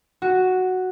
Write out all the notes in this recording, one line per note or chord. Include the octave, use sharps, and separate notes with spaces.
F#4